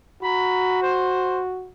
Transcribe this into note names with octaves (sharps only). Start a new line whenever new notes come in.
F#4 A#5 B5
C5